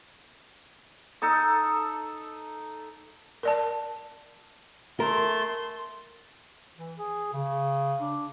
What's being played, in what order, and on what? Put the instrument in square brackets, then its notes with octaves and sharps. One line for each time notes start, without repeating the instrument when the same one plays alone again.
[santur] D#4 A4 E6
[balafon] A#4 D5 A5
[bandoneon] A3 A5 [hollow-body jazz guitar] A#4 [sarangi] C6
[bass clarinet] E3
G#4
C#3
D4